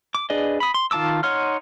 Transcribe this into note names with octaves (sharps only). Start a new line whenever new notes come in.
D6
D4 G#4 B4 D5 D#5
B5 D#6
C6
D#3 F4 A5 D6 E6
D#4 C#5 F#5 C6 F6